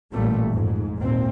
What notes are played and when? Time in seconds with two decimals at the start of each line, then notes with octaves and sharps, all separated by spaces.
0.12 A1 A#2 G3 A3
0.52 F2 G#2
0.99 G#1 D#2 A#2 C4